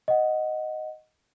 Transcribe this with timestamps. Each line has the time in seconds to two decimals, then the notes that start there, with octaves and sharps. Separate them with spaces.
0.08 D#5 F#5